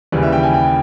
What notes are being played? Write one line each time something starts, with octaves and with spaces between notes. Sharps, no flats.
D#2 C#3 E3 G3 B4
E5
G5
G#5
G5